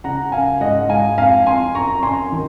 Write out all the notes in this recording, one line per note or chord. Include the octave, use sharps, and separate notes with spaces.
C#3 F#5 A#5
F#2 F5 G#5
G#2 D#5 F#5
G#2 F5 G#5
F2 F5 G#5
F2 G#5 C6
F#2 A#5 C#6
F#2 G#5 C6
D#3